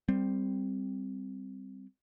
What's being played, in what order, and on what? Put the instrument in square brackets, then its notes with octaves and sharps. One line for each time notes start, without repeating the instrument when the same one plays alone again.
[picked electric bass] G3 C4